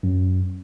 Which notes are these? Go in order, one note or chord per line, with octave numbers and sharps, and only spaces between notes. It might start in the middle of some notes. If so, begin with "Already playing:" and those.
F#2